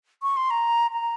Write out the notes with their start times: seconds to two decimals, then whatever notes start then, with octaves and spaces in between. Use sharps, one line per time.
0.22 C#6
0.37 C6
0.50 A#5
0.91 A#5